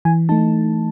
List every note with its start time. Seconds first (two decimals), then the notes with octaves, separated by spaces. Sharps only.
0.05 E3 G#5
0.29 A3 D#4 A5